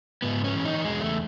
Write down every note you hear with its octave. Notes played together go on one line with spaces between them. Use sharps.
G#2 B3
C#4
E3
D#4
E2 G#3
A3